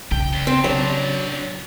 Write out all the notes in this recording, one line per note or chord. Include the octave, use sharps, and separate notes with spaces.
C#3 G5
D2
C4
A2 F#3 D4